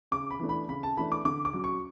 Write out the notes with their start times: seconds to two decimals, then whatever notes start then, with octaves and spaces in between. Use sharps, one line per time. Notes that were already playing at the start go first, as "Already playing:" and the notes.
0.11 C#3 D6
0.31 B5
0.40 E3 A3 D4
0.49 B5
0.69 C#3 B5
0.83 A5
0.97 E3 A3 D4 B5
1.12 D6
1.25 D3 D6
1.45 D6
1.53 F#3 C#4
1.64 C#6